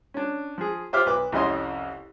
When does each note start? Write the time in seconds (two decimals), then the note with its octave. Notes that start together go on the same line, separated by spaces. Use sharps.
0.14 C#4 D4
0.58 F3 G#4
0.93 F4 G4 C5 E5 D6 F6
1.06 B1 B4 D6
1.32 C2 F2 C#4 D#5 C6